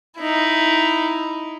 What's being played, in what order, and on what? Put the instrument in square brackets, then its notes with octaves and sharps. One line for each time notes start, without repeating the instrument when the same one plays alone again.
[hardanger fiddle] D#4 E4